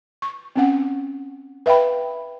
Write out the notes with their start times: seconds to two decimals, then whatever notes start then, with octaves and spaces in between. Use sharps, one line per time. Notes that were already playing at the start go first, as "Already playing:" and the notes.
0.22 C#6
0.56 C4 C#4 F#5
1.66 B4 E5 F5 G5 B5